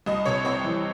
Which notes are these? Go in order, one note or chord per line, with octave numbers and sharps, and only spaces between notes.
C2 D#5
C3 C#5
C4 C#5
E3